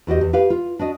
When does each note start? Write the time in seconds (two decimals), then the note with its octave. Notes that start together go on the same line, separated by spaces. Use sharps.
0.07 E2 F#4 G4 D#5
0.21 E2
0.33 G4 B4 F5
0.50 F4
0.79 D4 F#4 D#5